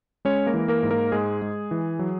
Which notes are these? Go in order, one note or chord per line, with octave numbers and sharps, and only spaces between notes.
G#3 C#4 C#5
A#3 A#4
E3
A#3 A#4
G#2
A#3 A#4
G#2 G#3 G#4
G#3
E3
F#3